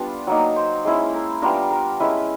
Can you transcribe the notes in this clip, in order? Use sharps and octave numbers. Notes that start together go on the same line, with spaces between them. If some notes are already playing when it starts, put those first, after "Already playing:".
Already playing: G3 B3 D4 F4
F#3 A#3 D#4
C5
G#3 C#4 E4 C5
A#4
G3 B3 D4 F4 A#4
A#4
G#3 C#4 E4 B4